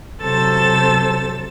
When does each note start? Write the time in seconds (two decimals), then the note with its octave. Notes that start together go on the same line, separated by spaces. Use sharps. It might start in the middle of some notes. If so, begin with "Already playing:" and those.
0.22 C3 F#3 A4 C5 E6 A6